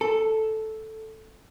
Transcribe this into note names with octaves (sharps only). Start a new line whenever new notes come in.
A4